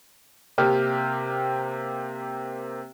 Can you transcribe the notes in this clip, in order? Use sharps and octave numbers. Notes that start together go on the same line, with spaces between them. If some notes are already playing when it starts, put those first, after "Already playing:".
C3 A#3 G4 F6